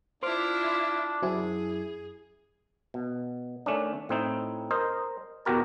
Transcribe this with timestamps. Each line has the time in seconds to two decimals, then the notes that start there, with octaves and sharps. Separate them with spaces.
0.23 D4 E4 F4 C5 C6 D6 F6
1.22 F#2 E4 F#4 G#4 C5 G#5
2.94 B2
3.66 D#3 A3 C#4 D4
4.09 A2 C4 D#4 E4
4.71 A#4 C5 D#5
5.45 E2 B2 F#4 G4 A#4 A5